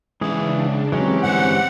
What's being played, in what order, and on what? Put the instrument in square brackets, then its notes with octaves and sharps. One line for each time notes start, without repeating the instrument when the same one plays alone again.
[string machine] C#3 D4 [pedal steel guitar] E3 G#4 [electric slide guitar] G#3 C#4 E5
[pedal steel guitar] E3 G#3 C#4 [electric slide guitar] F#3 [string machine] C4 G4
[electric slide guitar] G2 D3 C5 [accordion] F#5